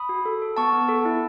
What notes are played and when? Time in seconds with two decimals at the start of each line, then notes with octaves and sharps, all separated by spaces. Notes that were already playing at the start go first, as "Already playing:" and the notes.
Already playing: B5 D#6
0.09 F#4
0.25 A4
0.42 A4
0.57 B3 A5 C#6
0.73 B3
0.89 A4
1.05 E4